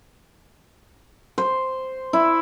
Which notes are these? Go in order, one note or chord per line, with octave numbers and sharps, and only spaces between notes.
C5
E4